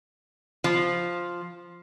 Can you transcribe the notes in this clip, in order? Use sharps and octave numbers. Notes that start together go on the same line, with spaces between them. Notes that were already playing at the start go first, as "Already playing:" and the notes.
F3